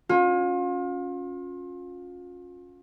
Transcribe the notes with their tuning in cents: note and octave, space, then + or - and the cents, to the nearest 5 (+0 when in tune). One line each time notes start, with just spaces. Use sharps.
C#4 +0 F4 +35